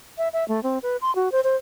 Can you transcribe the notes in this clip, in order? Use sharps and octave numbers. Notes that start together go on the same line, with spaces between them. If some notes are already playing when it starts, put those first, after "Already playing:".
E5
E5
A3
C4
B4
C6
F#4
C5
C5